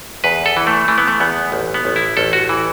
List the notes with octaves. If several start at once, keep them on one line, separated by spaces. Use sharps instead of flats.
E2 B4
A4
E3
A3
E3 A3
B3
A3
E2 B3
A1
B3
A1
E4
A1 A4
F#4
E3